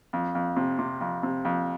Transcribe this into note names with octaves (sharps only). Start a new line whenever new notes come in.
F2
F2
C3
C3
F2
C3
F2